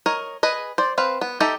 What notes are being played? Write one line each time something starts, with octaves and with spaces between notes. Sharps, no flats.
A#4 C#5 D#5
G#4 B4 D#5
C5 D5
C4 B4 F5
B3
D#4 G4 A4 D#5 E5